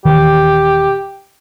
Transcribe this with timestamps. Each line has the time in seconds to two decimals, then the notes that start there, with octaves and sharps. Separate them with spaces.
0.05 D#1 D#3 E3 G4